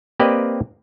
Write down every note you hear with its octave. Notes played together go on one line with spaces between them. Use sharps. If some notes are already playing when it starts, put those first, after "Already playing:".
A#3 C4 G4 B4 D5 D#5